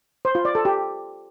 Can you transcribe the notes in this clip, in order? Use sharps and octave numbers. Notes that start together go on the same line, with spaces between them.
C5
F4
D5
A4
G4